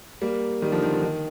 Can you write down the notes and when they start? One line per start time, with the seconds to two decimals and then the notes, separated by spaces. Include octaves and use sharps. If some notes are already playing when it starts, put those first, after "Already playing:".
0.22 G3 A#3
0.62 D#3 G3
0.72 D3 F3
0.82 D#3
0.93 D3
1.03 D#3